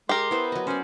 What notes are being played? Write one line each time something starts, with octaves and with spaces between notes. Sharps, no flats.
G#3 G4 A#4 C6
B3 E4 C5
F#3 D#5
C#4 C5 D5